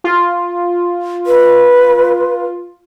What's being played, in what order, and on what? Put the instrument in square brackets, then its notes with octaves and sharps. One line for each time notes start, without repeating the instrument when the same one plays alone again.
[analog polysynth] F4
[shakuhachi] B4